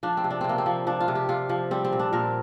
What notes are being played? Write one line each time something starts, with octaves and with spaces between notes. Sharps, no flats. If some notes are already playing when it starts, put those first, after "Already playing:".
F3 D4
C4
C3
D4
C3 C4
A#3
C4
F3
F3 D4
F4
C3
G4
C3 F4
F3
G3 C4
C4
A#2
D4
A#2 A#4